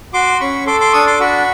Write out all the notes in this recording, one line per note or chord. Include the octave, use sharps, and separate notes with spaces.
F#4 C6 D6
C#4 B5 C#6
A4 C6 D6
C6 D6
D4 C#6 D#6
C6 D6
F#4 B5 C#6